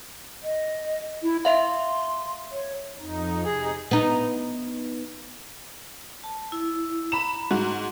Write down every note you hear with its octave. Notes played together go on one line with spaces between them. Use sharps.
D#5
E4
E5 F5 C6
C#5
F2 D#4
C3 D#4 G#4
B3 D#4
A5
E4
A#5 B5 E7
G#2 F#4